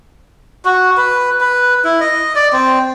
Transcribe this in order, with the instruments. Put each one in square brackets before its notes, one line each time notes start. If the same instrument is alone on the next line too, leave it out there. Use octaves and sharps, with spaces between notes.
[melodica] F#4
B4
B4
E4
D#5
D5
C4